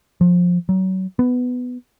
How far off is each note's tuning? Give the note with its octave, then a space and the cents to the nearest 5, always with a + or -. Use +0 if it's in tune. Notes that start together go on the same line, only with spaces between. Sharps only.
F3 +20
F#3 +30
B3 +10